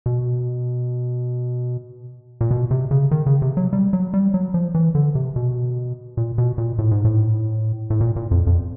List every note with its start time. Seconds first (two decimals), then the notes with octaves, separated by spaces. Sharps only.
0.06 B2
2.41 A#2
2.51 B2
2.71 C3
2.91 C#3
3.11 D#3
3.26 C#3
3.42 C3
3.57 F#3
3.73 G3
3.93 F#3
4.14 G3
4.34 F#3
4.54 F3
4.75 E3
4.95 D3
5.15 C3
5.36 B2
6.17 A#2
6.38 B2
6.58 A#2
6.79 A2
6.91 G#2
7.05 A2
7.90 A2
8.01 A#2
8.16 A#2
8.31 F2
8.47 F2